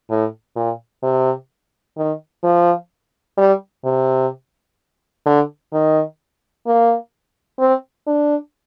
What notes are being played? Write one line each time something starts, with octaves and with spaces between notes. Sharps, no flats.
A2
A#2
C3
D#3
F3
G3
C3
D3
D#3
A#3
C4
D4